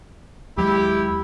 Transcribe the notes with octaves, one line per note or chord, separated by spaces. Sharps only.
D#2 F#3 G#3 E4 G4